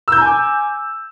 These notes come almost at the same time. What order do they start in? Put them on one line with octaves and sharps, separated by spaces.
E6 G6 A#5 G#5 D6